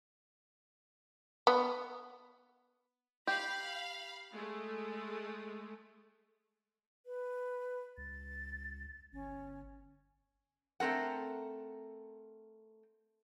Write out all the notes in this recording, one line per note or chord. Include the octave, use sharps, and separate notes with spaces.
B3
G4 F5 B5
G#3 A3
B4
C#2 A6
G1 C#4
A3 C4 A#4 F#5